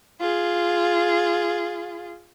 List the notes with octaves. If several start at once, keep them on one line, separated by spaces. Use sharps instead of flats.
F4 G#4